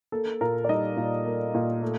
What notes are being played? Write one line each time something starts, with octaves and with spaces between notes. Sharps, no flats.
A#3 A4
A#2 A#4
D5
G3 D#4 D#5
A#2
A#3
A#2
A3